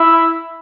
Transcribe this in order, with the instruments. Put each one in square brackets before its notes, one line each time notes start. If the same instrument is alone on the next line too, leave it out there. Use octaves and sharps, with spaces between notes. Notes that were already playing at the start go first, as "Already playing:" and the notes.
Already playing: [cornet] E4